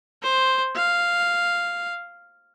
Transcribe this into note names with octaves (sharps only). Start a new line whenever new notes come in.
C5
F5